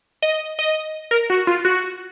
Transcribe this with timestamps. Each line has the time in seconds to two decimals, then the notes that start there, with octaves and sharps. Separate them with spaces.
0.22 D#5
0.59 D#5
1.11 A#4
1.30 F#4
1.47 F4
1.65 F#4